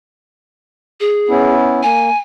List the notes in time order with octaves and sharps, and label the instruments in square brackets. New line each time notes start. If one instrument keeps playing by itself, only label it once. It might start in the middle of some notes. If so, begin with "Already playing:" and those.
[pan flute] G#4
[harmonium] B3 C#4 E4
[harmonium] A#3 [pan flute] G#5